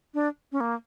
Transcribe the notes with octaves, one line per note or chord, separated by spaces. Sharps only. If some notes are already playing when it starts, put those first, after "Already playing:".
D4
C#4
A#3